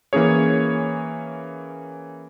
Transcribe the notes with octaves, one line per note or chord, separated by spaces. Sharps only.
E3 A#3 C#4 G#4 C#5